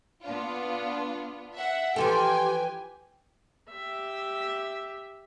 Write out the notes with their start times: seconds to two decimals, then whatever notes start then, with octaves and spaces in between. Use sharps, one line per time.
0.23 B3 D4 F4
1.55 E5 F#5
1.96 E3 F3 G4 A4 G5 G#5
3.70 G4 E5